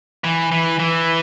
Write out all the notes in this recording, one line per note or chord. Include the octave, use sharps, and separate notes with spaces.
E3
E3
E3